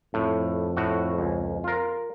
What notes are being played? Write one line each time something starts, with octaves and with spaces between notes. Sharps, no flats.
F2 A2
A2 F#4
C#2
F4 A#4